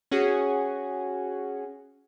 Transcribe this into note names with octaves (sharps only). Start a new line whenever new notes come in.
C#4 F#4 G#4